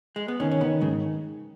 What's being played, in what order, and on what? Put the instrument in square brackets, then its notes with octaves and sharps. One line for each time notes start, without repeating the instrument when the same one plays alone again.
[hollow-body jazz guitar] G#3
B3
[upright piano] D#3 [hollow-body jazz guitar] C#4
[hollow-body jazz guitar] C#4
[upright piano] D#3 [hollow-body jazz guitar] B3
[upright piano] G#2 [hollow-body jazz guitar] C#3